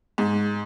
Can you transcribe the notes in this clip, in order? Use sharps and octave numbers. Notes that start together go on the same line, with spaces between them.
G#2